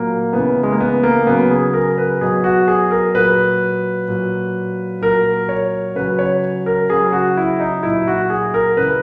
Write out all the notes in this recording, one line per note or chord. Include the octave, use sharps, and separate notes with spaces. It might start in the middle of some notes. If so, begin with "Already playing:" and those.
Already playing: A#2 F#3 A#3
C#3 E3 B3
G#3
A#3
B3
A#3
C#3 F#3 B3
G#4
A#4
B4
B2 F#3 G#4
F#4
G#4
A#4
A#2 F#3 B4
A#2 F#3
A#2 F#3 A#4
C#5
C#3 F#3 B4
C#5
A#4
C#3 F#3 G#4
F#4
E4
D#4
A#2 F#3 E4
F#4
G#4
A#4
C#3 E3 B4